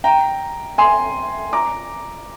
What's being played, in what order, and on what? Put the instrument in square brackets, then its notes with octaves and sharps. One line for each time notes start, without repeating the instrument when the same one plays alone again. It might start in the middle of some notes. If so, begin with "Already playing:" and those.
[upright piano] G5 A#5
G#5 C6
A#5 D6